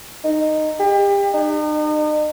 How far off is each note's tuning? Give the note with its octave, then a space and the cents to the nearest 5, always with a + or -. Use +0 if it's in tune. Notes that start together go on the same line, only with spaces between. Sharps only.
D#4 -10
G4 +35
D#4 -40